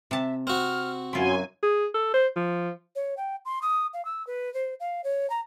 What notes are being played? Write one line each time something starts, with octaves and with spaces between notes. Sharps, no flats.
C3 E5 A5
C4 F#4 F6
F#2 E4 F4 G#5 C6
G#4
A4
C5
F3
C#5
G5
C6
D#6
F5
E6
B4
C5
F5
C#5
A#5